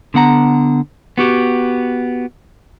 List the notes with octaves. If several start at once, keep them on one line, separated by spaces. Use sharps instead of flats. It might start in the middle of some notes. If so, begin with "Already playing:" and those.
D3 B3 F#5 A#5
B3 F#4 G4